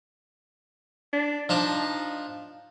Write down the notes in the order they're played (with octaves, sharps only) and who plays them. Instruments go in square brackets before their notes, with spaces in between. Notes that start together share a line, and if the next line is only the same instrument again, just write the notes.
[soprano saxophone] D4
[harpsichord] F3 D4 [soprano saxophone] D#4